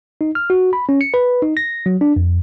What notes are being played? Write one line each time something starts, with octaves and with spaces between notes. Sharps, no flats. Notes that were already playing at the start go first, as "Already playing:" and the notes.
D#4
F6
F#4
B5
C#4
C#7
B4
D#4
A#6
F#3
D4
F2